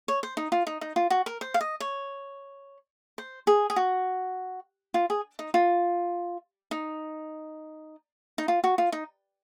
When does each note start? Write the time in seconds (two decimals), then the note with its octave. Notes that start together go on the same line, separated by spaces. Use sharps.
0.08 C#5
0.23 C5
0.37 D#4
0.52 F4
0.67 D#4
0.81 D#4
0.96 F4
1.10 F#4
1.26 A#4
1.41 C5
1.54 F5
1.61 D#5
1.80 C#5
3.18 C5
3.47 G#4
3.70 G#4
3.76 F#4
4.94 F4
5.10 G#4
5.39 D#4
5.54 F4
6.71 D#4
8.38 D#4
8.48 F4
8.64 F#4
8.78 F4
8.92 D#4